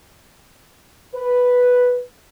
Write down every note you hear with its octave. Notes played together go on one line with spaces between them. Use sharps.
B4